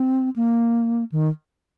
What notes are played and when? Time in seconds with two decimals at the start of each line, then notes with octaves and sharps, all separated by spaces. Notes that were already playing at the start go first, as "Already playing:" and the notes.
Already playing: C4
0.36 A#3
1.12 D#3